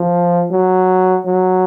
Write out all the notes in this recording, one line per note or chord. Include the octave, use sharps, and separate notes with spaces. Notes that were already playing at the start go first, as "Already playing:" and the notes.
Already playing: F3
F#3
F#3